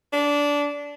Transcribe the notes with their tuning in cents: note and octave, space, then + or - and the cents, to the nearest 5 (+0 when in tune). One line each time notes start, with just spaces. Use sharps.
D4 -15